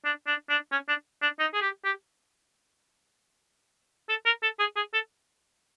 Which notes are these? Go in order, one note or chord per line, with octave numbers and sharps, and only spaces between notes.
D4
D4
D4
C#4
D4
D4
D#4
G#4
G4
G4
A4
A#4
A4
G#4
G#4
A4